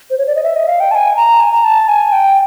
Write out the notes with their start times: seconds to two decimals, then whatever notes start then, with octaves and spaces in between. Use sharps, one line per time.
0.10 C5
0.18 C#5
0.27 D5
0.35 D#5
0.43 E5
0.56 D#5
0.67 F5
0.80 G5
0.91 A5
0.95 G#5
1.16 A#5
1.40 G#5
1.52 A#5
1.64 A5
1.88 G#5
2.12 G5